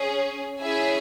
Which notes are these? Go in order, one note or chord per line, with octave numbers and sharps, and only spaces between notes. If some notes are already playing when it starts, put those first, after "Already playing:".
Already playing: C#4 G#4
C#4 E4 G#4 E5 G#5